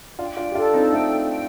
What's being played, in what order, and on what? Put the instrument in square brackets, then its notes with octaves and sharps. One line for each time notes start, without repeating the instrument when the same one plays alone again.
[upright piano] D4 F4 [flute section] G5
[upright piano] D4 F4
G4
[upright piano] D4 F4 [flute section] A4
[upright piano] C4 D#4
[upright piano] A3 C4 [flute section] G5
[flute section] G5